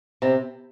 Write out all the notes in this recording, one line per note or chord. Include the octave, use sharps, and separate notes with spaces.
C3